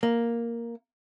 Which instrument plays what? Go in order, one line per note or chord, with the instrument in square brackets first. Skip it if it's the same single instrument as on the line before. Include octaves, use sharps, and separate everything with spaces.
[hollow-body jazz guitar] A#3